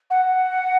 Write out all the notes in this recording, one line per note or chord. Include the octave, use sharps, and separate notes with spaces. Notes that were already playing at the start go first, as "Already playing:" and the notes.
F#5